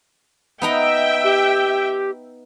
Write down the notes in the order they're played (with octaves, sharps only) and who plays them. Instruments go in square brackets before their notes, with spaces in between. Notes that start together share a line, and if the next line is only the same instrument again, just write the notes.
[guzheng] B3 D#4 A#5 [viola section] E5 G5
[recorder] G4